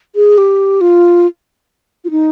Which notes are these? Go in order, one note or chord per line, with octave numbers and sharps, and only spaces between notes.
G#4
G4
F4
F4
D#4